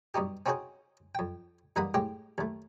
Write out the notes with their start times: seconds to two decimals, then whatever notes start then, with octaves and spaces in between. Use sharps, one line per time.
0.14 G2 B2 D#4 G4
0.46 C4 C#4 D#4 F#4 G#4 C5
1.15 F2 G5
1.76 E2 G2 A#3 D#4 F#5 B5
1.94 A2 G#3 G4 G5
2.38 D#2 A3